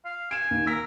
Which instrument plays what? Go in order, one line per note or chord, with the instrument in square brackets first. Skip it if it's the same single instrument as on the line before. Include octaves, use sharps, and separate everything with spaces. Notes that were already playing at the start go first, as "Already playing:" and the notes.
[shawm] F5
[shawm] G#5 [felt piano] D7 E7
[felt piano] D#2
[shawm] A#4 [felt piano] E6 B6